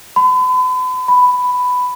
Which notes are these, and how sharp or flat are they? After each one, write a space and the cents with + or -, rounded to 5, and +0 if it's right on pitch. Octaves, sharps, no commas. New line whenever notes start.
B5 +40
B5 +10